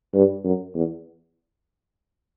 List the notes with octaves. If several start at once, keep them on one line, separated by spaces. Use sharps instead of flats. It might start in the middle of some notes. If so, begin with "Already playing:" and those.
G2
F#2
E2